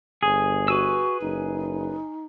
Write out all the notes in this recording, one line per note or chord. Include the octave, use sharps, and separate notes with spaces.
G1 G#4
F#4 B4 G#5 E6
F#1 D#4